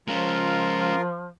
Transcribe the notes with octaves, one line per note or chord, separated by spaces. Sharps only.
F3 G#3 C#4 F4 A#4